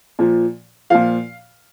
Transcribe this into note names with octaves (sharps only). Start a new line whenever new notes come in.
A#2 F3
A#2 F3 F5